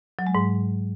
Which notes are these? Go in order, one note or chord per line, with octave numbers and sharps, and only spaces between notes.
F#3
G#3
G#2